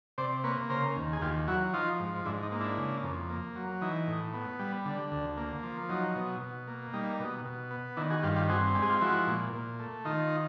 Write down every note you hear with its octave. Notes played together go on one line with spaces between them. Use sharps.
C3 C5 D5
A#3 B4 C#5
C#3 A#4 C5
D#2
G#4
D#2 F4 G4
F#3 E4 F#4
F3 D#4 F4
G#2
G#2 D4 E4
D#4
A#3
D4 E4
C#3
F2
A#3
F#3
E3 D#4
A2
B3
G3
D3
D2
A#3
F3
F#3 D#4
B2
B2
A#3
G3 D#4
B2
B2
B3
D#3 D4 E4
F#4 G#4
G2 F4 G4
F4 G4
C4 F#4 G#4
G#3 G4
G#4
F4 G4
F3 E4 F#4
A#2
A#2
A3
D#3 D#4 F4